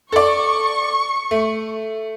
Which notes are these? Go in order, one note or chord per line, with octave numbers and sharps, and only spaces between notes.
A4 D5 C#6
A3